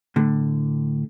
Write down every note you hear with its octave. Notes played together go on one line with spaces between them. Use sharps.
A2 D3